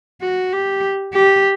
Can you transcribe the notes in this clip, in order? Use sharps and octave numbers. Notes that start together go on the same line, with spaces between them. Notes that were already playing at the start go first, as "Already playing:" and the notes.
F#4
G4
G4